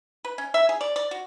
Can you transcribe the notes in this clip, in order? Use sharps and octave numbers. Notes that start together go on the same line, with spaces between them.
B4
C#4
E5
G#4
D5
D5
F#4